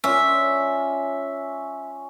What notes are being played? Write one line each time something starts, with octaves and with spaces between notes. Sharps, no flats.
C#4 F4 D5 E5